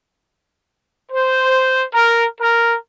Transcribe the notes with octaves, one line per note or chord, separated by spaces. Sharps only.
C5
A#4
A#4